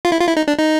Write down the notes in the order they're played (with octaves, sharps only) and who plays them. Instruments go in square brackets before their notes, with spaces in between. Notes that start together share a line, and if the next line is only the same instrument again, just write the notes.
[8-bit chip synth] F4
E4
F4
E4
D#4
D4
D#4